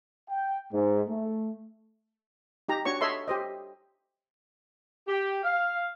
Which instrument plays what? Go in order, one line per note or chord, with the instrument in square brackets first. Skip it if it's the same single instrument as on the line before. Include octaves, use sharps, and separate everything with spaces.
[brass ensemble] G5
G#2
A3
[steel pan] D#4 G4 A#5
D4 F#4 C#5 C#6
A4 C#5 D#5 E5 B5 C6
G4 C5 D#5
[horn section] G4
F5